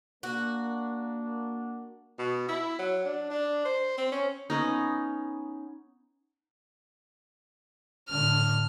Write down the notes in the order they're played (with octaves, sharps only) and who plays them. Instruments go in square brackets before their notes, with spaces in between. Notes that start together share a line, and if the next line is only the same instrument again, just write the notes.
[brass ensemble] A#3 D4 [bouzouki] F#4
[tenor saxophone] B2
E4
F#3
D4
D4
C5
C4
C#4
[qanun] B3 C#4 D#4
[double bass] A2 D3 [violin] F6